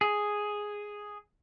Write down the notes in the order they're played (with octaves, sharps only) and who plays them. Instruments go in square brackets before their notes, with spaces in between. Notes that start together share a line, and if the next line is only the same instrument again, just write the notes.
[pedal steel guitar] G#4